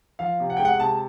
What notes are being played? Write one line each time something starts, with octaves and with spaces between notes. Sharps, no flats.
F3 F5
C3
F#5
G5
G#3
F#5
C3 A5